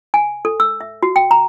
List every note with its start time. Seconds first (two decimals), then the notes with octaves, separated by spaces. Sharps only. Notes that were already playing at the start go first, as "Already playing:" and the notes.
0.14 G#5
0.45 A4
0.60 E6
0.81 E5
1.03 F#4
1.16 G5
1.31 A#5